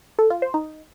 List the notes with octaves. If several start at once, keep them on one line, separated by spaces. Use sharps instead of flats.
A4
F4
C5
D#4